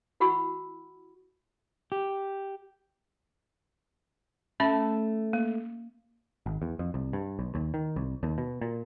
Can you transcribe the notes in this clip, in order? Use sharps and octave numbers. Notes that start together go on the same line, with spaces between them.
E4 F#4 F#5 B5 C#6 E6
G4
A3 C#4 A4 E5 B5
A#3
G#1
E2
F2
C2
G2
B1
D#2
D#3
C2
D#2
B2
A#2